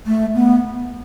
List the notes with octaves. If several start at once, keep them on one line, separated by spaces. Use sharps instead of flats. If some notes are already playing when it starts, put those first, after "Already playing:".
A3
B3